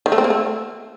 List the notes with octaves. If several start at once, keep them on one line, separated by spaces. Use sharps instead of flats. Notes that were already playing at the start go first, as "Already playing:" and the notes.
D#3
A3
C4
A#3
A3